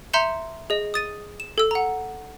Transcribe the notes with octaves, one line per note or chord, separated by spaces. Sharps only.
E5 A#5 C6 G6 C#7 E7
G#4 D#5
D#6 A6 D#7
E7
A4 E6
F#5 A#5